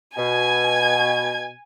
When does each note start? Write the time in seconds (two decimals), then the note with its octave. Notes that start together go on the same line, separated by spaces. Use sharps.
0.18 B2 G#5 G#6